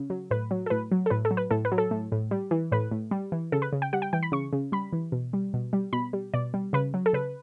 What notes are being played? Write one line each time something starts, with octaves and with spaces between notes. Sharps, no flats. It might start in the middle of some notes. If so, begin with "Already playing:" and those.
Already playing: C#3
F#3
A2 B4
F#3
A4
A2 B4
F#3
A4
A2 B4
A4
F#3
B4
A2 A4
B4
F#3
A4
A2
A2
G3
E3
A2 B4
A2
G3
E3
C#3 A4
B4
C#3
G5
G3 F#5
G5
E3 G5
B5
C#3 C#6
C#3
G3 B5
E3
B2
G3
B2
G3
B2 B5
G3
B2 D5
G3
C#3 B4
F#3
A4
C#3 B4